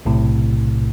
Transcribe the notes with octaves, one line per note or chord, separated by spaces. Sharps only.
B1 A2 C3